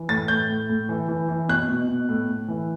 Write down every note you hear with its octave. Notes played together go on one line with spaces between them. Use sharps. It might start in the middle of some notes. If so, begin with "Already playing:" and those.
Already playing: E3
A2 A6
A2 G6
A2
A2
E3
E3
E3
B2 F#6
B2
B2
A2
A2
E3